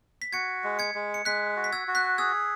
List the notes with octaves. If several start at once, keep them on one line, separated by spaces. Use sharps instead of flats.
B6
F#4 G#6 C#7
G#3
G#6 C#7
G#3
C#7
G#3 F#6 B6
F#4
B6
E6 G#6
F#4
F#6 B6
G#4 E6 G#6